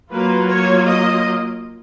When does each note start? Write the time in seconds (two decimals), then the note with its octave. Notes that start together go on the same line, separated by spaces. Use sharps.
0.12 F#3 A#3 F4 B4
0.49 C#5
0.86 D#5